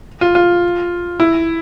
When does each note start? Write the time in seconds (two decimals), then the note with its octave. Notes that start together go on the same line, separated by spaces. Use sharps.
0.21 F4
0.35 F4
1.20 E4